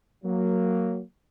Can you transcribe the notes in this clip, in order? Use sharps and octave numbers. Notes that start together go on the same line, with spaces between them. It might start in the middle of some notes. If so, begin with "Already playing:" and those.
F#3 A#3